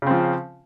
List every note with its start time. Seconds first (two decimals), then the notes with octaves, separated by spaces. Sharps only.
0.02 C#3
0.06 C4
0.11 F3